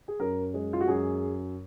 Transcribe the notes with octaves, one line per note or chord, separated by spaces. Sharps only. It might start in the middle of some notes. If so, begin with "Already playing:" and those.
G#4
F#2 A#4
G#3
F4
F#4
F#2 G#4